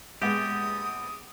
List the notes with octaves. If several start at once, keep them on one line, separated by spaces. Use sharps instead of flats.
A#1 G#3 B3 G4 D#6